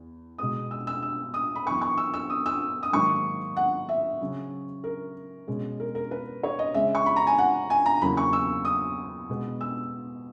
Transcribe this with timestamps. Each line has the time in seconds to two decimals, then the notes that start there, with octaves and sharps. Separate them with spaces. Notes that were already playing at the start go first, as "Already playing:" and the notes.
Already playing: E2
0.38 B2 G#3 B3 D#6
0.71 E6
0.87 E6
1.03 E6
1.34 D#6
1.55 B5
1.66 F#2 E3 B3 C#6
1.81 C#6
1.97 E6
2.14 E6
2.30 D#6
2.46 E6
2.83 D#6
2.93 G#2 D#3 F#3 A#3 C#6
3.57 F#5
3.89 E5
4.21 C#3 F#3 C#4
4.84 A#4
5.47 B2 G#3 C#4
5.80 A#4
5.95 A#4
6.11 B4
6.43 C#5
6.59 D#5
6.74 C#3 G#3 C#4 E5
6.95 C#6
7.06 B5
7.16 A#5
7.27 G#5
7.38 F#5
7.70 G#5
7.86 A#5
8.01 E2 C#3 F#3 A#3 C#4 B5
8.17 C#6
8.33 E6
8.65 D#6
9.29 B2 G#3 B3
9.61 E6